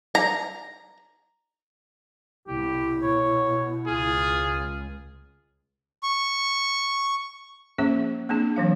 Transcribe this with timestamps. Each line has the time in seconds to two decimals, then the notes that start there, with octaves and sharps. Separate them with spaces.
0.15 A#5
2.47 C2 B2 E4 G4
3.02 B2 C#5
3.87 C#2 F4 G#4
6.03 C#6
7.78 F3 A#3 C#4 G#4 E5
8.29 A#3 C4 D4 G#4
8.56 E3 F#3 F5